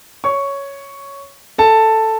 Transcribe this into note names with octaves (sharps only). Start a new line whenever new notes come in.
C#5 C#6
A4 A5